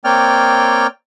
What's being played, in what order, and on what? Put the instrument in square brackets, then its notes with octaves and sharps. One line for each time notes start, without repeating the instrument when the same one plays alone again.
[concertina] A#3 C4 C#5 D5 G5 F6